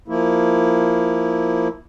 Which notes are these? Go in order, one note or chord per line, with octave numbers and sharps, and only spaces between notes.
F3 A#3 E4